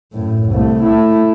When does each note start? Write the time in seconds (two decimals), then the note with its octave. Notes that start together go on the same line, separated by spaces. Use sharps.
0.13 F#2 A2
0.51 C2 A3
0.83 A3 E4